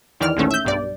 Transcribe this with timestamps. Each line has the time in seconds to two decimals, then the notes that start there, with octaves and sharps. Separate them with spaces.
0.20 E2 D#3 E3 D5 F6
0.37 A#1 E2 D#3 A3 C#4
0.51 E5 G6
0.65 B1 G2 D5